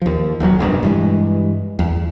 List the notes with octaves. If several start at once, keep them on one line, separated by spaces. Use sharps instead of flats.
D#2 F3
D#1 B1 A#2 F#3
F1 A#1 G2 B2
G2 E3 G#3
E2